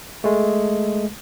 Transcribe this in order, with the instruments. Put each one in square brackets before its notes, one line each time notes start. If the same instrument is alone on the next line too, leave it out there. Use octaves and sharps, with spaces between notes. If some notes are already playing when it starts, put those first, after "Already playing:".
[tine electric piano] G#3 A3